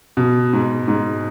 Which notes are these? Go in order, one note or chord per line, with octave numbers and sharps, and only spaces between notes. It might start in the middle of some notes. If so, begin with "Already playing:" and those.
B2
G#2
G#2